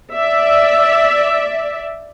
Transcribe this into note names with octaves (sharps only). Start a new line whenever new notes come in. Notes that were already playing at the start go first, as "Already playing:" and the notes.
D5 E5